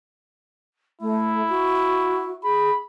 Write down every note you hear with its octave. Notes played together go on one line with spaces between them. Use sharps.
A3 E4
F#4
G#4 B5